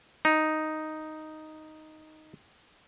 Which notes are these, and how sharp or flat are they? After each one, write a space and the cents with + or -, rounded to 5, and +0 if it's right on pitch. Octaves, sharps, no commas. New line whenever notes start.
D#4 +0